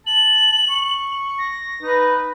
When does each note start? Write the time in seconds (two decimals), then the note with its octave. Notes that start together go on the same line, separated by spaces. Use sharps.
0.07 A5 F#7
0.70 C#6
1.39 A#6
1.82 D#4 B4